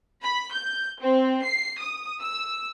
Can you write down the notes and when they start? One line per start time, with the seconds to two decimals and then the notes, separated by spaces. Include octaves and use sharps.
0.23 B5
0.53 G6
1.01 C4
1.44 C7
1.81 D#6
2.21 E6